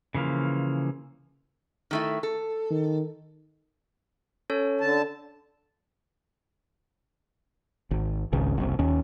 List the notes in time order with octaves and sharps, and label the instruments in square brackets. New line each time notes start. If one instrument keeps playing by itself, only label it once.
[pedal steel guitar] C#3 E3 F3 A#3
[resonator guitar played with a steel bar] D#3 A3 E4
A4
[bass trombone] D#3
[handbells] C#4 A4 C#5
[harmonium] D3 A5
[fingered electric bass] G#1
G#1 C#2 C#3
F#1 C2
D#2 C#4